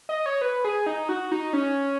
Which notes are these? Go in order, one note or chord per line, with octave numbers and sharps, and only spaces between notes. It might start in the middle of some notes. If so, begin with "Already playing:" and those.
D#5
C#5
B4
G#4
D#4
F#4
D#4
C#4